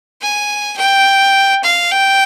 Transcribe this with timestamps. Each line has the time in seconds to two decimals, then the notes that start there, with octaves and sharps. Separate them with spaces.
0.21 G#5
0.77 G5
1.64 F5
1.92 G5